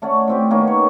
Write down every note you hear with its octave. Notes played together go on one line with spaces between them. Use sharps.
A3 C#4 D5 F#5
A2 C4 G4
D#3 A#3 B3 C#4
C#5